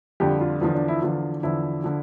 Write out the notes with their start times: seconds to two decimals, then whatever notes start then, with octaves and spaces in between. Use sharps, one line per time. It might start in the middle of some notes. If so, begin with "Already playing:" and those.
0.20 F2 D3 G3 G4
0.41 F4
0.61 E2 D3 F3 F4
0.75 D4
0.88 E4
1.02 E2 D3 F3 F4
1.43 E2 D3 F3 E4
1.84 D3 F3